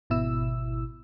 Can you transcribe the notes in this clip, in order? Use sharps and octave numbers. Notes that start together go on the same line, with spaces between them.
G#1 B2 E4 E6